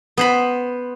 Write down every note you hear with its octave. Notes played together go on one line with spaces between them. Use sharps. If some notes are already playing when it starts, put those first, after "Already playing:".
B3 C5 B5